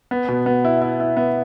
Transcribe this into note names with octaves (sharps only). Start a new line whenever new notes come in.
B3
B2
B3
E4
E4
E4
B3